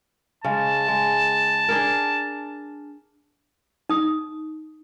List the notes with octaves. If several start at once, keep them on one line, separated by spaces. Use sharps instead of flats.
C#3 G#3 A5
G#3
D4 G#4 A#4
D#4 D#6